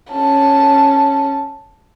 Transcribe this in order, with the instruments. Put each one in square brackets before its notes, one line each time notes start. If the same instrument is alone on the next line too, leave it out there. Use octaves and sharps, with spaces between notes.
[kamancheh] C#4 A5